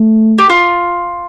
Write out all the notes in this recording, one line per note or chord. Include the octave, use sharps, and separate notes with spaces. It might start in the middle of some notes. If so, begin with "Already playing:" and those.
Already playing: A3
G4
F4